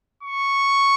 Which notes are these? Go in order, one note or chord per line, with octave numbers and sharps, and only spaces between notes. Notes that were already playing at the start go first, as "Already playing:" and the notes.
C#6